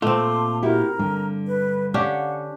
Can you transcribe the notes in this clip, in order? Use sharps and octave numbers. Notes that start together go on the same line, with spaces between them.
A#2 A3 C4 F4 A5 C6 D6
E4 F#4 G4 A#4 A#5
G2 D3
B4
C#4 D4 G4 F5 F#5